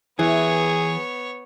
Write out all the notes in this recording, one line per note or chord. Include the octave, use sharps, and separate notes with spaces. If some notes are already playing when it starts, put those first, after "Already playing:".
E3 B3 G#4 C#5